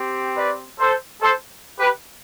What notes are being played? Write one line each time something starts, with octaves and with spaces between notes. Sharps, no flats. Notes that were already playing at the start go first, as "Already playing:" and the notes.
Already playing: C4 G4
B4 D5
A4 C5
A4 C5
G4 B4